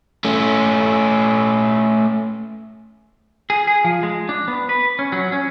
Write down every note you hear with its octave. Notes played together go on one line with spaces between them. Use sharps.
A3 C#4
G#4
G#4
F3
G#3
D4
B3
B4
C#4
F#3
C#4